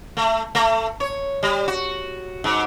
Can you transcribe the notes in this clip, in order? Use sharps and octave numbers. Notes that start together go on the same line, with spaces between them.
A3
A3
C#5
G3
F#4
G#2